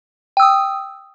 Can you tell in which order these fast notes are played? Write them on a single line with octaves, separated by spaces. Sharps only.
G5 E6 D#6